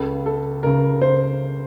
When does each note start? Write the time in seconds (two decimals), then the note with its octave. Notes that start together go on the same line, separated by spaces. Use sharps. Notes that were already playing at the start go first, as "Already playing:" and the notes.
Already playing: C#2 C#3 A4
0.26 A4
0.63 C#2 C#3 A#4
1.01 C5